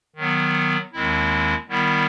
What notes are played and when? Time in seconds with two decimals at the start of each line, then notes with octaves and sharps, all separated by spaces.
0.16 D#3 F#3 B3
0.93 D#2 D#3 G#3 C4 E4
1.69 D#3 G3 B3 E4